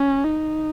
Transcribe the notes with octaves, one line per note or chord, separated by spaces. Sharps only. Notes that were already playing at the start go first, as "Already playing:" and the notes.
Already playing: C#4
D#4